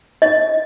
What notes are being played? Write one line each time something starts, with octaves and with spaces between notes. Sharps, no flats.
D#4 D#5